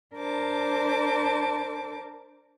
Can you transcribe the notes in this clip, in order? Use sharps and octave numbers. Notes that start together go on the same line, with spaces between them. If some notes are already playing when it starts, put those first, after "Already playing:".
D4 A#4 C5 A5 D6